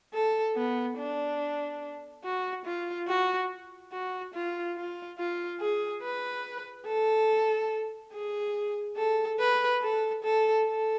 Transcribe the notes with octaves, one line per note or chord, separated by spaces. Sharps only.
A4
B3
D4
F#4
F4
F#4
F#4
F4
F4
F4
G#4
B4
A4
G#4
A4
B4
A4
A4
A4